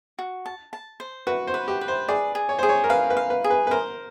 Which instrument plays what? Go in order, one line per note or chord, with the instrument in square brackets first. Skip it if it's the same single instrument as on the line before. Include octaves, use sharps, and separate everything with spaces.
[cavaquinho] F#4
A5
A5
C5
[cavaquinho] F#4 [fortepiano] B4
[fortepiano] C5
[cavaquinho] B4
[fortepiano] G4
[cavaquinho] B4
[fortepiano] C5
[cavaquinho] G#4 [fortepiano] D5
[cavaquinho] G#4
[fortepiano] C#5
[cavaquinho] G#4 [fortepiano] C5
[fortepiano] C#5
A#4
[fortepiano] B4 [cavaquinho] F5
[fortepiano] B4
[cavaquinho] F5
[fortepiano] B4
[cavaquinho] G#4
[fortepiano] B4
B4
[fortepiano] A#4 [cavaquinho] C5